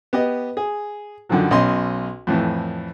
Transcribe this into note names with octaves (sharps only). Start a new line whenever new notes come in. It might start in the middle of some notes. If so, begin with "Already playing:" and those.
B3 G4 D#5
G#4
F#2 D3 D#3 F3 F#3
B1 C#4 D#5 C6
F2 A2 E3